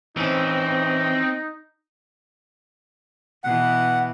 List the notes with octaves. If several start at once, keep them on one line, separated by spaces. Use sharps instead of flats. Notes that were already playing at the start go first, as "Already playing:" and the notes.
E3 C4 C#4 D#4
B2 E3 F#5